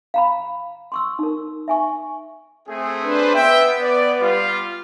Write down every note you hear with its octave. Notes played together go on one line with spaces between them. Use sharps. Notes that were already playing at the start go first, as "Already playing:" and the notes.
F5 A#5 B5
C6 C#6 E6
D#4 A#4
E5 G#5 C#6
A3 C4 G#4
D4 B4 C5
B3 E5 G5
D5
G3 F4